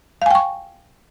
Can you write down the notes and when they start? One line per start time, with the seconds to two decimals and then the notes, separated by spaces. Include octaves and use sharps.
0.22 F5
0.26 G#5
0.31 G5
0.35 C#6